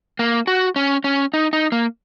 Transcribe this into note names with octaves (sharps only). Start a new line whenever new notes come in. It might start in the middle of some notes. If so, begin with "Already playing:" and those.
A#3
F#4
C#4
C#4
D#4
D#4
A#3